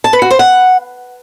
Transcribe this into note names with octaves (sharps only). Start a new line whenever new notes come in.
A5
B4
F#4
C5
F#5